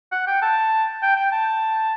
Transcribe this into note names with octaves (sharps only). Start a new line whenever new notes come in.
F#5
G5
A5
G5
G5
A5